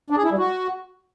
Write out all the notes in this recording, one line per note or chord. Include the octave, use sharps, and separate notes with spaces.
D4
G#4
E4
G3
F#4